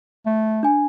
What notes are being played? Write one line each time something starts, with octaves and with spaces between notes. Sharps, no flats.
A3
D4 G#5